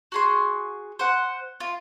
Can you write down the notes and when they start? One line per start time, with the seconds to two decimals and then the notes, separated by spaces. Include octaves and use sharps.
0.12 F#4 G#4 C6
0.99 C5 F#5
1.60 F4